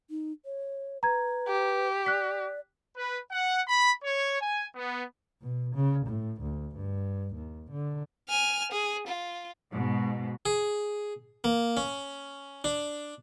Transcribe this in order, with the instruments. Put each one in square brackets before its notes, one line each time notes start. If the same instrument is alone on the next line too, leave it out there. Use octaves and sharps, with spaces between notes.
[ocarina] D#4
C#5
[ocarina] B4 [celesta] A#5 G#6
[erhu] G4
[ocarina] D5 [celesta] F#6 B6
[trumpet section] B4
F#5
B5
C#5
G#5
B3
[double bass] B2
C#3
A2
D2
G2
D#2
D3
[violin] G#5 F6
G#4
F4
[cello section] G#2 B2
[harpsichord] G#4
A#3
C#4
D4